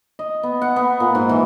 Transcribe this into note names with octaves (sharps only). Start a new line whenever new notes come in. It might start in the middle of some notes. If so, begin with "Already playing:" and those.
D#5
B3
F#5
B3
A#2
G#2
E3